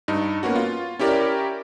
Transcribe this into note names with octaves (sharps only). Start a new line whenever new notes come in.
G2 D#4
A#3 B3 C#4 F#4
F4
C#4 E4 G4 A#4 D5